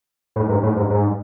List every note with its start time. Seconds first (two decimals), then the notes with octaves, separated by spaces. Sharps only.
0.36 A2
0.49 G#2
0.63 A2
0.77 G#2
0.90 G#2